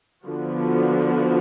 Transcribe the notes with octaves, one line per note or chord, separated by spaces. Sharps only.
D3 F3 B3 F#4